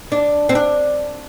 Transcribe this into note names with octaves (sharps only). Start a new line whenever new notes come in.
D4
C4
D4